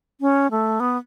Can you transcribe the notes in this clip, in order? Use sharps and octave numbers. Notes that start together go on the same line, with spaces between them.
C#4
A3
B3